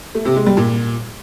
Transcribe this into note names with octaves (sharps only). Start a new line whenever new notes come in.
A3
C3
G#3
G3
A#2